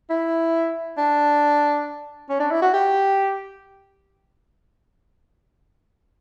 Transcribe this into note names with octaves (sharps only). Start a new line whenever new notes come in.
E4
D4
C#4
D4
E4
F#4
G4